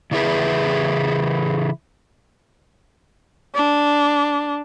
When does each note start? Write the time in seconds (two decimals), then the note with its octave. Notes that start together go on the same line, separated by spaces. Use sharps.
0.11 C#3 E3 E4 G#4 B4
3.55 D4